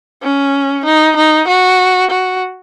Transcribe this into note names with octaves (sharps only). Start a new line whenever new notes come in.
C#4
D#4
D#4
F#4
F#4